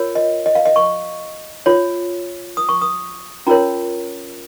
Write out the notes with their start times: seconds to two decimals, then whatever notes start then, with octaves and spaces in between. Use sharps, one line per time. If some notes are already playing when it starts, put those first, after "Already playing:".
Already playing: F4 A#4 C#5
0.15 D#5
0.46 D#5
0.55 F5
0.65 D#5
0.76 C#6
1.66 F4 C#5
2.57 D#6
2.69 C#6
2.82 D#6
3.47 C#4 F4 A#4 C#5 A#5